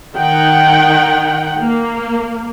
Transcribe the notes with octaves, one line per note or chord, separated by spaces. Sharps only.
D#3 D#4 F#5 G5
A#3